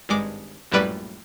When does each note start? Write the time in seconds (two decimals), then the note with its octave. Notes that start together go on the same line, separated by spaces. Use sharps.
0.09 G#1 G2 G#3 D6
0.72 A#1 F#2 A2 G3 B4 D5